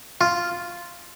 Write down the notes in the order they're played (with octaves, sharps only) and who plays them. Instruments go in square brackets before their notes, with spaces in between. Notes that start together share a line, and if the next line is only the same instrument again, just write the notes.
[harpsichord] F4